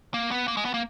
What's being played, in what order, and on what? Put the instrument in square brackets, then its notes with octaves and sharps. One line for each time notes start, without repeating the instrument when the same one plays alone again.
[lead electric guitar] A#3
B3
A#3
G#3
B3
A#3